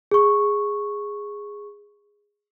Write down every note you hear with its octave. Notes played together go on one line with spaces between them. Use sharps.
G#4 C#6